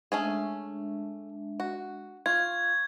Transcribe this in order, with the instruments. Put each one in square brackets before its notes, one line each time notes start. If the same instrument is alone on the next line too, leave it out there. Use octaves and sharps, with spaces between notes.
[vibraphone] G#3 D4 E5 [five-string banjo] A3 C#4 G#4
[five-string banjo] F#4
[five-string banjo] F4 [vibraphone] C#6 [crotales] G#6